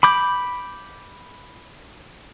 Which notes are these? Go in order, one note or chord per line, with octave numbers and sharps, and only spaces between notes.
B5 D6 G6